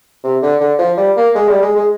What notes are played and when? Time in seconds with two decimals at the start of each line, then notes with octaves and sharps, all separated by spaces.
0.24 C3
0.42 D3
0.60 D3
0.79 F3
0.97 G3
1.16 A#3
1.35 G#3
1.48 G3
1.62 G#3
1.76 G#3